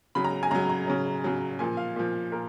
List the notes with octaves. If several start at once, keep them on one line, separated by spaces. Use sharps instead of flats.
C#3 F#3 B5
A#5
G#5
C#3 F#3 A#5
A#5
C#3 F#3
C#3 F#3
A#2 F3 G#5
F5
A#2 F3
A#2 A#4